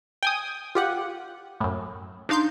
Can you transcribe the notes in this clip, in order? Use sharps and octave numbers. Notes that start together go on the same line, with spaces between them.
G5 G#5 D#6
F4 G4 F#5
F#2 A2
D4 D#4 F5 C6 G6